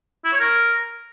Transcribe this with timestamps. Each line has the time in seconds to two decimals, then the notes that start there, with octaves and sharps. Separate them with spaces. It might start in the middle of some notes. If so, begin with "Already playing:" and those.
0.25 E4
0.33 C#5
0.40 A#4